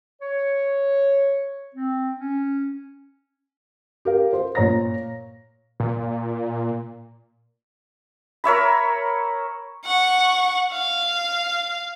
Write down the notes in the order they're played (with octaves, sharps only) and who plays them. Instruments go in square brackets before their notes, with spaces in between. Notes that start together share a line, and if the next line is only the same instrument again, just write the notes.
[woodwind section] C#5
C4
C#4
[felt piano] G4 A#4 F5
C5
A#2 C#5 A#5 A#6
[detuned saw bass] A#2
[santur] A#4 C#5 E5 B5
[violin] F#5 C#6
F5